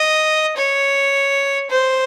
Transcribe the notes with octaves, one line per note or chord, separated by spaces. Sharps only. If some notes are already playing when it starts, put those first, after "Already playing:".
Already playing: D#5
C#5
C5